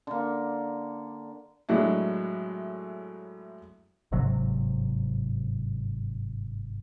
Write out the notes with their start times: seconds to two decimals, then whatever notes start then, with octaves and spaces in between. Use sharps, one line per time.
0.07 D3 A#3
1.69 A2 F#3 G#3 D4 E4
4.12 G1 G#2 C3 F#3